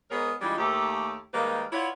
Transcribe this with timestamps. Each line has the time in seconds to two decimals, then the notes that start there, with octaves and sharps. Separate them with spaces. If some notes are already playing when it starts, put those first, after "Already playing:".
0.10 G#2 B3 G#4 A#4 C#5 D#5
0.41 E3 G3 G#3 D4 D#4 F4
0.58 D#2 A3 G4
1.33 D#3 G3 G#3 A#3 B4 F5
1.72 E4 F4 B4 C#5 D5 F#5